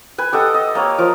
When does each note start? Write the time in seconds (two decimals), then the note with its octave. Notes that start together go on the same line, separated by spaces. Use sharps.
0.18 B4 G#5
0.33 G4 A4 D#5 F#5
0.54 D#5
0.75 A#3 C#5
0.98 F3 A#4